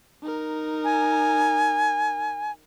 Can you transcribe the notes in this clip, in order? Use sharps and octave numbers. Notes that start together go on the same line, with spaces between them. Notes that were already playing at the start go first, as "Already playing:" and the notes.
D#4 A#4
G#5